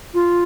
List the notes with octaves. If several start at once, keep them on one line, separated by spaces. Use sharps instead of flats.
F4